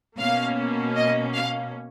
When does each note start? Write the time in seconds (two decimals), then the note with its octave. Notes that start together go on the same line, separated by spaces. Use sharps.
0.19 B2 A#3 C#4 F5
0.96 D#5
1.34 F5